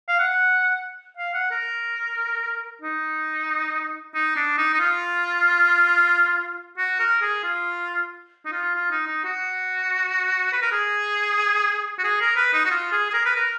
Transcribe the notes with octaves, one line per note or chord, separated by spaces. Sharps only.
F5
F#5
F5
F#5
A#4
D#4
D#4
D4
D#4
D#4
F4
F#4
A#4
G#4
F4
D#4
F4
F4
D#4
D#4
F#4
B4
A#4
G#4
F#4
G#4
A#4
B4
D#4
F#4
F4
G#4
G#4
A#4
B4
A#4